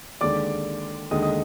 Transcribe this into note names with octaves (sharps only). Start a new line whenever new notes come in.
D#2 D3 G#3 D5 D6
D#2 D3 G#3 D#5 D#6
D#5 D#6